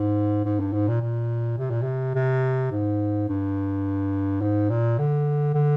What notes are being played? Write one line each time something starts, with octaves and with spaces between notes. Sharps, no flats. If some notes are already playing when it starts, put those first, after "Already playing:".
Already playing: G#2
G#2
G2
G#2
A#2
A#2
C3
A#2
C3
C3
G#2
G2
G#2
A#2
D3
D3